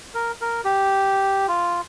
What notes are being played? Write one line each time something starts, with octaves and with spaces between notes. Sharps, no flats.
A#4
A#4
G4
F4